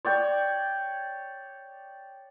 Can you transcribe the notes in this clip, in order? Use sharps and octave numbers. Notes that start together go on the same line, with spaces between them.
C#5 D5 G5